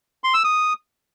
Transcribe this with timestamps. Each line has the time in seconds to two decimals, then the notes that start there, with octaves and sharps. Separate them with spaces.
0.24 C6
0.34 E6
0.44 D#6